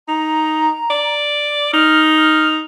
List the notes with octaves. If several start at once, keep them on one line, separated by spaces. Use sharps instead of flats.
D#4 A#5
D5
D#4 F6
F6